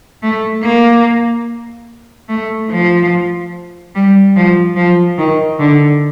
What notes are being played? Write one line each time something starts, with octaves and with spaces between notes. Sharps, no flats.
A3
A#3
A3
F3
G3
F3
F3
D#3
D3